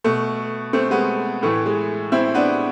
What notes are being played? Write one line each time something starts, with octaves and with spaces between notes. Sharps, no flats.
B2 A3
A3 C4
G#3 B3
A2 E3 A3
G#3
C4 E4
B3 D4